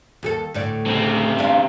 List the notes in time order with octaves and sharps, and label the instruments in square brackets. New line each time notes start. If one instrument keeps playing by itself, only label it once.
[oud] D#2 G#4 A4
D2 A2 D5
[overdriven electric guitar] C#3 C4
[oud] D4 F4